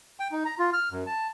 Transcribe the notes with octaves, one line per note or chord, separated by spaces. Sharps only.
G5
D#4
A#5
F4
F6
F#2
A5